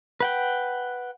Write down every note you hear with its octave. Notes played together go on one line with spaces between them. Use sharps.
B4 F#5 G5